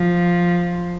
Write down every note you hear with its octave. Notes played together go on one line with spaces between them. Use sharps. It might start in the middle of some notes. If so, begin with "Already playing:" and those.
Already playing: F3